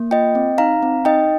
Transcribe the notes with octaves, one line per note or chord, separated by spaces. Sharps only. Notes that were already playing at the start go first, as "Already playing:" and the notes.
Already playing: A#3
F4 D#5 G5
C4
D#4 F5 A#5
C4
D#4 D#5 G5